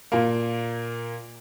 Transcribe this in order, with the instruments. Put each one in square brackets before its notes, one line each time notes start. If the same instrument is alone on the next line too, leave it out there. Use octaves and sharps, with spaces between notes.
[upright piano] A#2 A#3